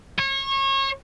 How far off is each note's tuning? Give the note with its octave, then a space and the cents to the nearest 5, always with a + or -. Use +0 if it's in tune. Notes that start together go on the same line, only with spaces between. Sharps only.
C#5 -30